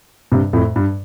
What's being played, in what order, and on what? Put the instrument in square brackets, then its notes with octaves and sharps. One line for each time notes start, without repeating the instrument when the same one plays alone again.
[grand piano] G2 C3
F2 A2
G2